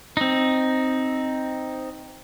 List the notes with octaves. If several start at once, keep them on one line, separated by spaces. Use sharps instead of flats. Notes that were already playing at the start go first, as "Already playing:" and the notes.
C4 D#4